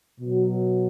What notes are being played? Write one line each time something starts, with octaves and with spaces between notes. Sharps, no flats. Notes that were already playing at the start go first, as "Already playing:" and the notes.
B2 F#3